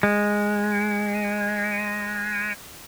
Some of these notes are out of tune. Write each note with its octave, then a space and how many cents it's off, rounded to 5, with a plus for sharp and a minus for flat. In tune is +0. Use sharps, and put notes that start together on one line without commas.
G#3 -5